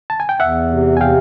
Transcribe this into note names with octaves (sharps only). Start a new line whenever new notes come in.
A5
G#5
G5
E2 E5 F#5
C3
G#5
C3 F5 G5